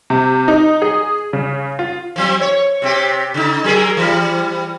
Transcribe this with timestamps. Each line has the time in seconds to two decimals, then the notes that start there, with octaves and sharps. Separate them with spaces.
0.10 C3
0.48 D#4
0.82 G#4
1.33 C#3
1.79 F4
2.16 F3 F#3 C4
2.41 C#5
2.82 C3 C4 G4
3.34 C#3 D#4
3.64 F#3 G#4 A#4
3.97 E3 G3